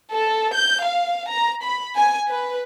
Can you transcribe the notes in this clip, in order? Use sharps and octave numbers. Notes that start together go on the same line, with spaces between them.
A4
G6
F5
A#5
B5
G#5
B4